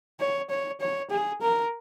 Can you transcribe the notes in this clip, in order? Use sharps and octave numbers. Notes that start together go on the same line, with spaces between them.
C#5
C#5
C#5
G#4
A#4